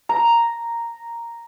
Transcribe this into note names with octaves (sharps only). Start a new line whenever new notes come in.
A#5